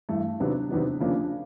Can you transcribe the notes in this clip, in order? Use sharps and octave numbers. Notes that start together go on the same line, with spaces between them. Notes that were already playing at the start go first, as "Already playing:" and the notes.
G2 E3 A3
C3 D#3 F#3 B3 D4
C3 D#3 F#3 B3 D4
C#3 F3 A#3 D4